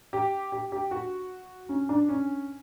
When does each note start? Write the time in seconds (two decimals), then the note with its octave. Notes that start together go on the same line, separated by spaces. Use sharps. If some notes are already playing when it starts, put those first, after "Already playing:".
0.13 G4
0.52 G4
0.72 G4
0.91 F#4
1.69 C#4
1.89 D4
2.09 C#4